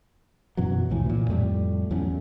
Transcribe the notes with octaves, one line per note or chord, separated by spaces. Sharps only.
F#2 B2 E3 F#3
C2 F2 A2 E3
A#2 E3
F2 A2 G3 A3
E2 F#3 A3 C#4